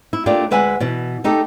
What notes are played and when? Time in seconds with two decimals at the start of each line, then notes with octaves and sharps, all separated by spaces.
0.13 E4
0.26 A3 A#3 D4 F4 G4
0.51 D2 G#3 B4 E5 F#5 G#5
0.80 B2 E3
1.24 A3 D#4 G4 A4